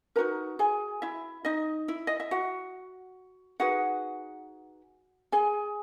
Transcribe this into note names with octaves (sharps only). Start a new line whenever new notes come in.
D#4 F#4 A#4 B4 A#5
G#4 G#5
E4 E5
D#4 D#5
E4 E5
D#5
E5
F#4 F#5
D#4 F#4 G#4 B4 F#5
G#4 G#5